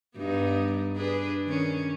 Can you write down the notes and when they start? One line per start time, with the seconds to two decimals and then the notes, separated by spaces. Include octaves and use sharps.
0.17 G2 B3 D#4
0.96 D4 G#4 B4
1.45 D#3 C#4